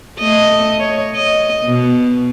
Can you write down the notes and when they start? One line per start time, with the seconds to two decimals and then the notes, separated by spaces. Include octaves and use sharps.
0.19 A3 D#5
0.80 C#5
1.15 D#5
1.65 B2